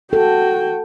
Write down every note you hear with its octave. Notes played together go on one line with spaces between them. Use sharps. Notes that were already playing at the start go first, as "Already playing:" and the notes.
F#4 A4 G5